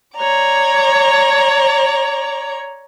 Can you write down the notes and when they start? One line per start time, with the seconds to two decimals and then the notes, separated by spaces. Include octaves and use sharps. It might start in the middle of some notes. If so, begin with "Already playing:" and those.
0.17 C#5 D5 A#5